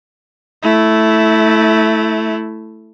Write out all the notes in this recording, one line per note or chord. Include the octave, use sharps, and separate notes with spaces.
A3 E4